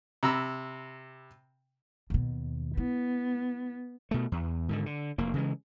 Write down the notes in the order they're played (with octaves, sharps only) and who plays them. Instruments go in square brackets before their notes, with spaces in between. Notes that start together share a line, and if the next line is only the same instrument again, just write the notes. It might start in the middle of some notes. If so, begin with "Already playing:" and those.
[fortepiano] C3 A#5 B5 E6
[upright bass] D#2 B2
[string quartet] B3 [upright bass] E4
[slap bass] B2 A3
E2
G#2 D3 D#3
D3
F1 A#3
C#3 E3 G#3